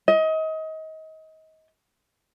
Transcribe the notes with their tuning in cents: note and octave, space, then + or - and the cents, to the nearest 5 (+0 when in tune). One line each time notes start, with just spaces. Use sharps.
D#5 +30